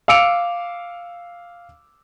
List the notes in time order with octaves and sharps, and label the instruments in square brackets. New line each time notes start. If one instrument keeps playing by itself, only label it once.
[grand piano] F5 D6 E6 C#7 D7 F7